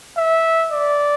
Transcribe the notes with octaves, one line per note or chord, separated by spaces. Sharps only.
E5
D5